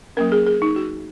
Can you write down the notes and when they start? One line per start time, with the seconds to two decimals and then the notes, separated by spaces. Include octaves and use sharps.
0.17 F#3 A#3 C#4 A#4
0.32 G#4
0.46 G#4
0.62 D#4
0.76 F#4